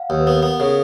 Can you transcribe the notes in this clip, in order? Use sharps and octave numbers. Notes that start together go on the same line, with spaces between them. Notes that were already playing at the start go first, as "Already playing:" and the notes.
Already playing: F5 F#5
D#2
B4
B3 A#4
B3
C#3 A#4